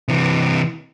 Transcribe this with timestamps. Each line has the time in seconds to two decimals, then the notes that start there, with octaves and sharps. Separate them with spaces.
0.08 C3 E3